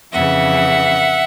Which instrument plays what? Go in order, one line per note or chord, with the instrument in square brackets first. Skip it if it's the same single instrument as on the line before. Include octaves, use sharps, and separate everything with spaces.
[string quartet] F2 C#3 E3 E5 F#5